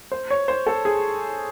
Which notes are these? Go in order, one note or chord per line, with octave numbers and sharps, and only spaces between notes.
C5
C#5
C5
A4
G#4